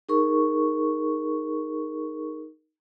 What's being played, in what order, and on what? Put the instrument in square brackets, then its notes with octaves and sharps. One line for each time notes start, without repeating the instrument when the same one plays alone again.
[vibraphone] D#4 G#4 A#4 C#6